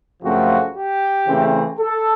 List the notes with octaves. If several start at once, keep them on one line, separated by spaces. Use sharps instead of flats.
F#2 C#3 F3 A3 C4 F#4
G4
C#3 E3 A3 C4
A4